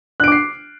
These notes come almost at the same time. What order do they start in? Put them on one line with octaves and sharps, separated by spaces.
F#6 D7 D6 C7